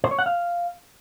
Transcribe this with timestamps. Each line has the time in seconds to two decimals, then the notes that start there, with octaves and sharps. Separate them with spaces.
0.04 C5
0.11 C#5
0.19 F#5
0.26 F5